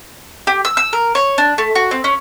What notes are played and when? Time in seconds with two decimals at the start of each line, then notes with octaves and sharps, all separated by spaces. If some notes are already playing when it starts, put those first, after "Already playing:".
0.47 G4
0.65 E6
0.77 E6
0.93 A#4
1.15 C#5
1.38 D4
1.58 A3
1.75 F#4
1.91 C4
2.04 C#4